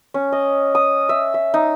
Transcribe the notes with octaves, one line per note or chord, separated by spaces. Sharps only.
C#4
D#5
D#6
E5
E5
D#4